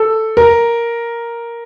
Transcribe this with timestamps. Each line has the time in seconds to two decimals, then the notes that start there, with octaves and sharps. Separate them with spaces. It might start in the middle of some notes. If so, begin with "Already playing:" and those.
Already playing: A4
0.37 A#4